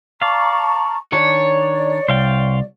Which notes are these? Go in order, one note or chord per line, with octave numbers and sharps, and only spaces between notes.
D5 F5 A5 A#5 C#6
D#3 D4 C#5 D5
C2 C5 F5 G5